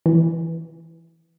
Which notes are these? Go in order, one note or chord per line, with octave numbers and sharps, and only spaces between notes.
E3